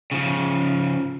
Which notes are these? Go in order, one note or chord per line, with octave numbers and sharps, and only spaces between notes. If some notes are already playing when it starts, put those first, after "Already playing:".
C#3 F3